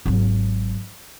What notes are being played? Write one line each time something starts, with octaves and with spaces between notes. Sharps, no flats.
G#1 F#3